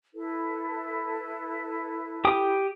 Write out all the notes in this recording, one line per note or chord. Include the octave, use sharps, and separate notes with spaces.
E4 A4 B4
G4 G5 D#6